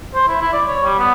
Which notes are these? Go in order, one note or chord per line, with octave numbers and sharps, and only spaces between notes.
C5
E4
E4
D5
C#5
G3
B3